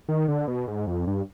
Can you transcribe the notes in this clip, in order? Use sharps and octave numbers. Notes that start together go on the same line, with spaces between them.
D#3
D3
B2
G#2
F2
G2